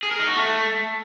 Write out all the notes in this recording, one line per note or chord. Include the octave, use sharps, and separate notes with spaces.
G#4
A#4
D#4
F#4
A3